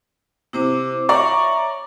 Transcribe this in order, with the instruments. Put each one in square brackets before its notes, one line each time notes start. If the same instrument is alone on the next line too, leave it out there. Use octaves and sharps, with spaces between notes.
[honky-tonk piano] C3 [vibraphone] E4 C5 D6
[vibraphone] C#5 E5 [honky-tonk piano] D5 A#5 [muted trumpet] C#6